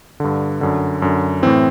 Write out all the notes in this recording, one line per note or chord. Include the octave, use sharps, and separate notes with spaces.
G2 D3
F#2 D3
F#2 D3
A2 E3 C4